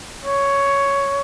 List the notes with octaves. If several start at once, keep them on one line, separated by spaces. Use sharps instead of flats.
C#5